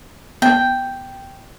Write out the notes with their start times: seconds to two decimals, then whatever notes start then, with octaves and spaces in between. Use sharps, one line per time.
0.42 B3 G5